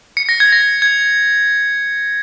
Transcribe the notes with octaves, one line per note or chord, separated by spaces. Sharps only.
C#7
A#6
G#6
A#6
G#6